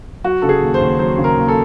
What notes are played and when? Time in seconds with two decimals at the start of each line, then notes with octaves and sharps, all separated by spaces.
0.24 F#3 F#4
0.42 C#3 A4
0.49 G#4
0.61 D#2
0.74 C5
0.81 D#2
0.99 F#3 C5
1.18 C#3
1.24 A#4
1.36 D#2
1.48 A4